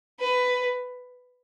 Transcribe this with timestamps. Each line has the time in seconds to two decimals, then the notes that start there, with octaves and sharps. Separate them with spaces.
0.20 B4